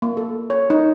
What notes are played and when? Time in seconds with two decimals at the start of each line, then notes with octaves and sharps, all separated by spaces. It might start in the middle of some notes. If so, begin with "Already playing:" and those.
0.02 A#3
0.17 A4
0.50 C#5
0.70 D#4